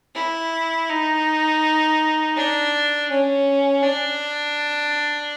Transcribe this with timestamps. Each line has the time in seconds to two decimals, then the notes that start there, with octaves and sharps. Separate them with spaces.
0.15 E4
0.89 D#4
2.36 D4
3.10 C#4
3.83 D4